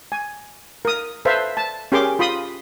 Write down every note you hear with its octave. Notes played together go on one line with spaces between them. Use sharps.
G#5
A#4 D#6
A4 B4 C5 E5 F5 A5
A5
C#4 G4 G#4 A#4 C6 D6
F4 B5 C6 D#6